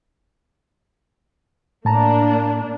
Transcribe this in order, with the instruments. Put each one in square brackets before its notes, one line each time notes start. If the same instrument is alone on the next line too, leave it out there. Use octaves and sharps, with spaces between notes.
[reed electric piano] A2 A5 A#5 [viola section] A#3 D4